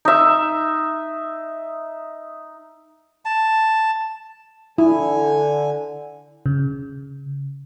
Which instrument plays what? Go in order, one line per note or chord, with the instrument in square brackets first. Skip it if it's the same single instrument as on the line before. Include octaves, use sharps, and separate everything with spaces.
[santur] D#4 E5
[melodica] A5
[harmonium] D3 G#5 [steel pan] E4
[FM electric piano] C#3